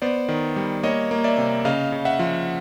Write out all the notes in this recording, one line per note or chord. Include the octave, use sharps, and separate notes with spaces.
B3 C5 D5
D#3
G3
A#3 C#5 D#5
A#3
D5 E5
C3
C#3 D#5 F5
C#3
E5 F#5
F3